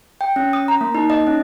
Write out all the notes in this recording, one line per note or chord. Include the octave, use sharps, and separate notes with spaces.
G5
C#4
D#6
A#5
A#3
D#4
D#5
C#4